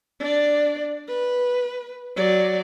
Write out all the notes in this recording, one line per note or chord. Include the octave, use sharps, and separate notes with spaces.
D4 D5
B4
F#3 D5